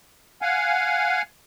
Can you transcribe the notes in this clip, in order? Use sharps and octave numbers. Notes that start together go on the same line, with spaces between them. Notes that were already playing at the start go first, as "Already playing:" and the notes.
F5 F#5 G#5